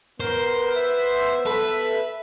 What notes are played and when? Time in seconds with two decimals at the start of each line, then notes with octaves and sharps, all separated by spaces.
0.20 B3 A#4 C5
0.75 E5
1.46 A4 B4